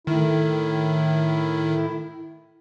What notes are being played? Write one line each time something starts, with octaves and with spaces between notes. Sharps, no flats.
A2 D#3 E4